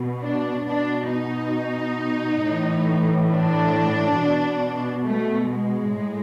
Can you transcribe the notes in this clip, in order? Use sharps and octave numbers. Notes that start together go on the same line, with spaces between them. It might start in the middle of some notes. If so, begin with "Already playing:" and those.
Already playing: B2
D4
B2 D4
D#4
A2 E3
D4
B2
A3
G#3
A2